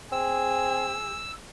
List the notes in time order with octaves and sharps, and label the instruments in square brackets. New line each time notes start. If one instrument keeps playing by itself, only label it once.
[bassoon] C4 [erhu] G#4 [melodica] E6